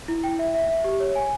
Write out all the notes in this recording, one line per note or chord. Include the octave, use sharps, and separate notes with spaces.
E4
G5
E5
E5
E5
G4
C#5
G#5